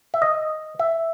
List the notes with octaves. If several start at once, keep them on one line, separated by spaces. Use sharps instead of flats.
E5
D#5
E5